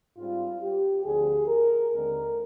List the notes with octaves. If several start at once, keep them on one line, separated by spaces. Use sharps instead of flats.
G#2 G3 C4 F4
G4
D2 D3 F3 C4 G#4
A#4
D#2 D3 G#3 C4 A#4